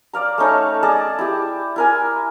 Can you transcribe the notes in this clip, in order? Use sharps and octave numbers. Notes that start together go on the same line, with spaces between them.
D5 F5 A#5
A3 C#4 D#4 A4
G#4 D5 D#5 A5
E4 G4
E4 A#4 G#5